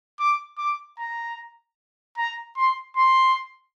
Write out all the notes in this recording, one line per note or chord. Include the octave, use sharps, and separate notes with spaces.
D6
D6
A#5
A#5
C6
C6